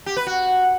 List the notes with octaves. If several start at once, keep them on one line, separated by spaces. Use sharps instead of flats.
G4
B4
F#4